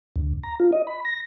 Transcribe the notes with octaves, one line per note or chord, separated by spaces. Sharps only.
D2
A#5
F4
D#5
B5
A#6